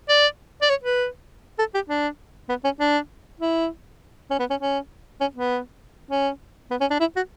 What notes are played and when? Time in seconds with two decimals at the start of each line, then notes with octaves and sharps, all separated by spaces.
0.09 D5
0.62 D5
0.70 C#5
0.84 B4
1.59 A4
1.75 G4
1.90 D4
2.49 B3
2.64 C#4
2.80 D4
3.40 E4
4.30 C#4
4.39 B3
4.50 C#4
4.60 C#4
5.21 C#4
5.35 B3
6.11 C#4
6.71 B3
6.81 C#4
6.90 D4
7.00 E4
7.16 F#4